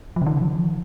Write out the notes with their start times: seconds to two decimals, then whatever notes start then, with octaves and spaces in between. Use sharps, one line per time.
0.16 F3
0.22 C#3
0.26 D#3
0.36 C#3
0.42 F3
0.46 D#3
0.56 F3